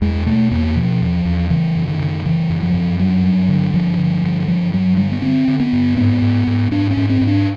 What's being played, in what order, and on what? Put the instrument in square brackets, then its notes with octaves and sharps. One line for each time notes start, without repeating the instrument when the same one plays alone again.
[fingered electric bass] E2 G#3
B2 A3
E2 A#3
B2 F3
E2
E2
C#3 E3
F#2
D#3
C#3
C#3 E3
F#2
F3
F#2
G2 F#3
G2
D3
G2 F3
D3
G2
G2 F3
G2 F#3
D3 G3
B3
D3 C4
D3
B3
G2
G#2 B3
G#2
G#2
G#2 D4
C#4
G#2
C4
G#2
D4